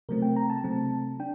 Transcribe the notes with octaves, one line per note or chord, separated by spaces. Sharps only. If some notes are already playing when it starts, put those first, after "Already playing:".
C3 F#3 A3 C4 A#4
G5
A#5
A5
C3 F#3 A3 C4
D4 G5